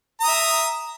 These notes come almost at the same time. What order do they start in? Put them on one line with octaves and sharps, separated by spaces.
A#5 D#6 E5